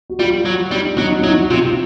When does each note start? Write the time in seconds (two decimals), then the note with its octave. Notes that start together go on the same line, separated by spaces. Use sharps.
0.10 F#4
0.19 G3 F4
0.45 F#3
0.71 G3 D#4
0.98 F#3 D#4
1.19 D#4
1.24 F#3 E4
1.50 C3 F4